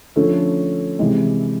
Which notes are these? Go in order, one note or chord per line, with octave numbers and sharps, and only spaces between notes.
D3 F3 A3 C#4
C3 E3 G#3